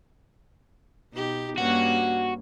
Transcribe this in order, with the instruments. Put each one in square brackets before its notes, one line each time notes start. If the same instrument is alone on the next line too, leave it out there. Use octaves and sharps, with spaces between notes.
[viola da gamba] B2 D#4 G4
[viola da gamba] G2 A#3 C#4 [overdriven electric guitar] F#4